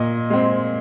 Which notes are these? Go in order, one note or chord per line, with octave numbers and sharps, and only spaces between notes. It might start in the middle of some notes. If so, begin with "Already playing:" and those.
Already playing: A#2 D#5
G#3 C4